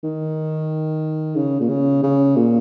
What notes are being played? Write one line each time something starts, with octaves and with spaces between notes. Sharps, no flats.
D#3
C#3
A#2
C#3
C#3
A#2